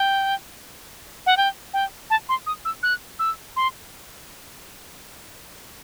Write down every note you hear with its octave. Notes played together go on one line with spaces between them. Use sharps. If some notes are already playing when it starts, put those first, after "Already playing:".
Already playing: G5
F#5
G5
G5
A5
C6
D#6
E6
F#6
E6
C6